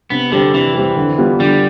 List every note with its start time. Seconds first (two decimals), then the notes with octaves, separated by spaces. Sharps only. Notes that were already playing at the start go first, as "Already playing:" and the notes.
0.10 C3 B3
0.32 D3 G3 C4 G4
0.54 C3 E3
0.75 G3 C4 G4
0.96 D3
1.18 G3 B3 F4
1.40 D3 G3